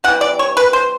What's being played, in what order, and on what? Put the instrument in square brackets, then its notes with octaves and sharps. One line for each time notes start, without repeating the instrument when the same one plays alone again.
[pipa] C3 E3 G3 F#5
D5
C#5
B4
C5